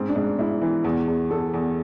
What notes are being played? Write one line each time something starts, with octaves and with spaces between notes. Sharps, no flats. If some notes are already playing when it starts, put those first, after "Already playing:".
Already playing: G#2 C4
D4
G#2
G#2 E4
E3
E2
E2
E2 A4
E2